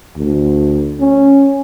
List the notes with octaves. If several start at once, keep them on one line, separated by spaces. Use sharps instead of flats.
D2
C#4